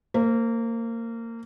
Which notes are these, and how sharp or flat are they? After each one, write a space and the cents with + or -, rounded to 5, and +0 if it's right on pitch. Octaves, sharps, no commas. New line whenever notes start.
A#3 -25 C5 +0